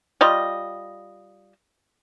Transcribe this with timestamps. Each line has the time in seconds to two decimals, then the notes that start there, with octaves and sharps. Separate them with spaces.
0.21 G3 F4 D#5